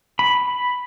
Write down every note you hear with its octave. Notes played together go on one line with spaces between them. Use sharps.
B5